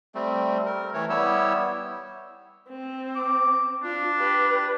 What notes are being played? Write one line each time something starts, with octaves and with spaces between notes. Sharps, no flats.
G3 A3 C4
A#4
E3 A3 C#5
G3 B3 E4 G4 C#5 E6
C4
D6
D4 F4
G4 B4